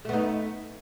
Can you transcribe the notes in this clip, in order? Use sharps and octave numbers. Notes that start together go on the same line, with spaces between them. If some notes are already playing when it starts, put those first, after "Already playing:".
A3 B3 D#4